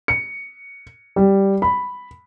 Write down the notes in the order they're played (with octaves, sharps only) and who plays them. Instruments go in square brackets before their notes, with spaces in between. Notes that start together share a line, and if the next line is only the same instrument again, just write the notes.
[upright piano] C#7
G3
B5